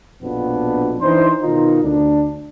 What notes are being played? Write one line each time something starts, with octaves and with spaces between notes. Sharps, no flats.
A#1 F2 B2 F3 B3 D4
E3 D4 D#4 C5
B2 D#3 D#4 F4
D2 D4